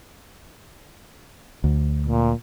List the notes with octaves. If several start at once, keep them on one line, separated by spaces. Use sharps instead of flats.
D2
A#2